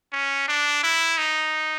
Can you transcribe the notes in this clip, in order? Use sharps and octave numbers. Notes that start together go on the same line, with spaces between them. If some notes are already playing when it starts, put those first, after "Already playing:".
C#4
D4
E4
D#4